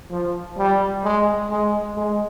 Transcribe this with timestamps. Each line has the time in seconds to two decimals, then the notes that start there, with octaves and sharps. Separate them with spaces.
0.11 F3
0.58 G3
1.04 G#3
1.50 G#3
1.96 G#3